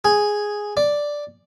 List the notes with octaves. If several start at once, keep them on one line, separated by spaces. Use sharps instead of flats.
G#4
D5